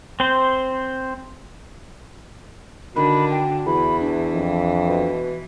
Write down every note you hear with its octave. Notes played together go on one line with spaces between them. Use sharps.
C4 C5
D3 D#3 D4 F#4 B5
G5
E2 E3 B5
D4
F2
B2